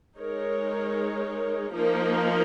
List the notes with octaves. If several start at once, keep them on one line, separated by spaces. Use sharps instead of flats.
G#3 D#4 A#4 C#5
F3 A#3 D#4 A#4